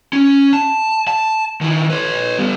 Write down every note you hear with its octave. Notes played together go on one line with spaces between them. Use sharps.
C#4
A5
A5
D#3 E4
B4 C#5
G3 B3